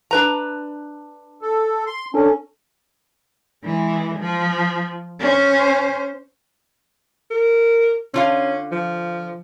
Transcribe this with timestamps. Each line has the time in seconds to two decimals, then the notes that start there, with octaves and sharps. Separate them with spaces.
0.11 D4 B4 A#5
1.42 A4
1.86 C6
2.14 C#4 D4 A4
3.64 E3 G#3
4.19 F3
5.19 C#4 C5
7.30 A#4
8.14 D3 C#4 F4 F5
8.72 F3